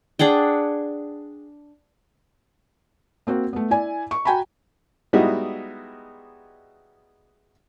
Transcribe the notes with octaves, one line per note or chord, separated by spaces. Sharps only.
D4 G#4 F#5 G5
A#3 C4 F#4
A3 B3
E4 D5 G#5
C#6
F#4 G5 G#5 A#5 B5
G3 G#3 B3 D#4 E4 F#4